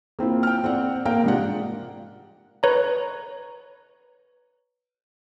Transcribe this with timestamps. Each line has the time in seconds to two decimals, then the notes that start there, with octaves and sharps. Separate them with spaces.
0.19 A#3 C4 E4 F4
0.43 G5 F6
0.64 C4 C5 D5 F#5
1.05 A#3 A#4 F5 G5
1.24 G#2 C3 D4 F4 F#5
2.63 B4 C#5 A#5